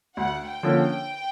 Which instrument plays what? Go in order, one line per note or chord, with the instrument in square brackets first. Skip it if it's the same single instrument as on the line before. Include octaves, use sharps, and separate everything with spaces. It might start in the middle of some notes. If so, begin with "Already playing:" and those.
[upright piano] D2 [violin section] F#5
[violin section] G5
[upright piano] D3 F3 A#3 C#4
[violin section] G5